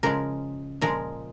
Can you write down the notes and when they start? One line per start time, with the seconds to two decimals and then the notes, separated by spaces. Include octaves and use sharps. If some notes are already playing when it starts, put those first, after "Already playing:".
0.03 C#3 F3 G#3 A#4
0.81 A#2 F3 G#3 A#4